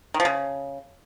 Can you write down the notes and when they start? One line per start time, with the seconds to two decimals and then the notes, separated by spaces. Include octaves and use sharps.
0.14 D#3
0.20 F3
0.25 C#3